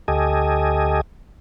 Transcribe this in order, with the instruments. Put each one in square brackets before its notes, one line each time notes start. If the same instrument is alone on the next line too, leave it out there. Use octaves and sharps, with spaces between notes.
[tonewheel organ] D2 G4 A4 D#5 G#5